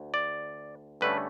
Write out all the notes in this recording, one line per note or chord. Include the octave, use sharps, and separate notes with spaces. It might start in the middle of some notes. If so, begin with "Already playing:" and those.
Already playing: D2
D5
G2 D3 A3 C#4 B4